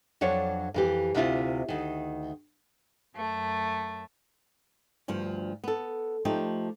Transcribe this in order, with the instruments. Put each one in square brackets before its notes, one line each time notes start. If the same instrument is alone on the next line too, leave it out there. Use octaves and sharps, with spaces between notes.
[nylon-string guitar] F2 F#3 D4 C#5
F2 E3 G4
D2 C3 E4 F4
D2 D#3
[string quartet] F#2 A3
[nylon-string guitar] D2 G2 F3
B3 A4
F3 A3 D#4 G4